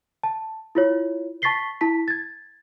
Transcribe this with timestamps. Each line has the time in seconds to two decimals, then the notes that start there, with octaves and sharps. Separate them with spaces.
0.23 A5
0.75 E4 F4 C#5
1.42 A5 C#6 A6 B6 C7 G7
1.81 E4 A5 B6
2.08 G#6 A6